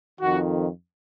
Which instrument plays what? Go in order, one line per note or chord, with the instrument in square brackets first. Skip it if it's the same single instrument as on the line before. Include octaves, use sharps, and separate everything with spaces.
[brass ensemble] F2 D#3 F#4